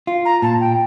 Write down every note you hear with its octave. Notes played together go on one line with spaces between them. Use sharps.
F4
A#5
A#2 A5
G5